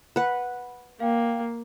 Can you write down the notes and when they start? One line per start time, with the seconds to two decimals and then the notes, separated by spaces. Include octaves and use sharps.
0.16 B4 F#5
1.00 A#3 F5 G5